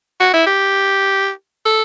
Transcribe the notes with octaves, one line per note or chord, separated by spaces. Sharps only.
F#4
E4
G4
A4